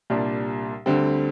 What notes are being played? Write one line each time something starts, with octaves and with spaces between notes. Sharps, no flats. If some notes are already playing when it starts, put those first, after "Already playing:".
C2 A#2 G3 D4
D2 D3 G3 C4